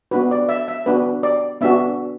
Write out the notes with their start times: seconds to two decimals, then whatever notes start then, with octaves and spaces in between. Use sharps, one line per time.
0.11 B3 D4 F#4 B4
0.31 D5
0.49 E5
0.68 E5
0.86 B3 D4 F#4 B4
1.23 D5
1.61 B3 D4 F#4 E5